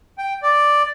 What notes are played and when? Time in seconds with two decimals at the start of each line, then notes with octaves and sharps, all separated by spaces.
0.18 G5
0.43 D5